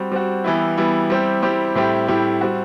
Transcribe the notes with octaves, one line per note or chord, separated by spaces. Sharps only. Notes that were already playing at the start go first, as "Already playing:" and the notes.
Already playing: G3 C4 F#4
G3 C4 F#4
E3 G3 B3 E4
E3 G3 B3 E4
G3 C4 E4 G4
G3 C4 E4 G4
A2 G3 C4 E4 G4
A2 G3 C4 E4 G4
G3 C4 F#4